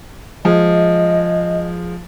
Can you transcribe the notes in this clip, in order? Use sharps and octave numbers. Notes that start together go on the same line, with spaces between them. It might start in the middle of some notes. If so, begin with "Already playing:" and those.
F3 G#3 D#5